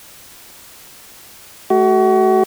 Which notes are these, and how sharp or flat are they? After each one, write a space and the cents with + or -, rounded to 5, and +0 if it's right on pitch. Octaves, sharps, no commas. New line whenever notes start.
A3 -30 F#4 +30